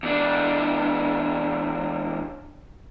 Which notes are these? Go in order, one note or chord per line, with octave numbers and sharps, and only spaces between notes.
E2 D4